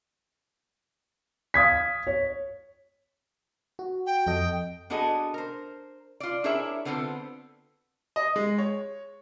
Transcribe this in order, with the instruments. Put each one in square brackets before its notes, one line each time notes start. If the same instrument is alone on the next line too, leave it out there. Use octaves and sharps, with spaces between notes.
[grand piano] F5 D#6 G#6 B6
C#5
[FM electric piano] F#4
[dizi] G5
[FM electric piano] F2 A4 D#5
[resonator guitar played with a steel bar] B3 D4 F#4 G#4 A4 D#5
A#4 C5
F4 D5
D4 E4 G#4 A#4 C#5 E5
D3 B3 C4 F4 G4 A4
[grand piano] D#5
G#3
C#5